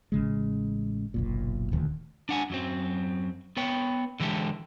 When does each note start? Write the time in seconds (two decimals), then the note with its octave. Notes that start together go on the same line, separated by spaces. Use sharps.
0.12 A1 C#3 G#3
1.14 F#1 B1 A#2
1.72 D#1 D2 D#3 A3
2.29 D4 F#5 G#5
2.50 F#2 F#3 C4
3.57 B3 B4 C#5 G5
4.20 D3 E3 G#3 G4 A4